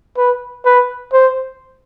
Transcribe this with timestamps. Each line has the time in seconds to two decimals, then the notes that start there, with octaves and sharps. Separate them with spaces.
0.17 B4
0.65 B4
1.13 C5